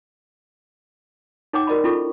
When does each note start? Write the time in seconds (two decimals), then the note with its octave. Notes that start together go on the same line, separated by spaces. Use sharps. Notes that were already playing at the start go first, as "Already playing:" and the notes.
1.53 D#4 C#5 F#5 G5 A#5 D6
1.67 F#4 A#4 D5 D#5 A#5 B5
1.84 C#4 E4 F4 A4 B5 C#6